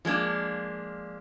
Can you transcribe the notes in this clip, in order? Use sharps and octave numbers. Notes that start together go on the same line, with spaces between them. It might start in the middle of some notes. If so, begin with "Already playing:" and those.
F3 G#3 A#3 D4